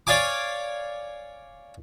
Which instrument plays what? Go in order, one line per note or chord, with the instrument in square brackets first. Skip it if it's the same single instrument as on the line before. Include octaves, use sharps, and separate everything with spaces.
[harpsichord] C#5 D5 F5 G#5 D6